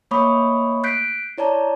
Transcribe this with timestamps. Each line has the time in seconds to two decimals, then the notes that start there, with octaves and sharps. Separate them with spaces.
0.11 A3 A#3 C#5 B5 C#6 D#6
0.84 F#6 G6 B6 C7 D7
1.38 E4 C#5 D5 A5 A#5